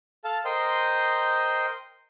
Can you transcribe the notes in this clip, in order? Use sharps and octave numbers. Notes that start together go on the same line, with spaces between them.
A4 F5 A5
A#4 C5 D#5 G5 C6